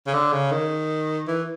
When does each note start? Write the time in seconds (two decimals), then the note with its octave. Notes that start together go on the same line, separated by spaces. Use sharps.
0.07 C#3
0.14 D3
0.32 C#3
0.51 D#3
1.28 E3